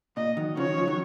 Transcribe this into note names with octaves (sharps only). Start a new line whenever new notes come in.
A#2 D#5
D#3 F#3
C#3 F3 C#5
D#3 F#3
C#3 F3
D#3 F#3